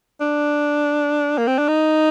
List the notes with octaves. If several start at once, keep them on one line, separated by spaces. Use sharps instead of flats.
D4
A#3
C4
D4
D#4